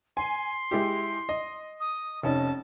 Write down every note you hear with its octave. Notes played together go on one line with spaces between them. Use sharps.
G#5 C6
G#3 E4 G4
D#5
D#6
F1 C#4 D#4 A5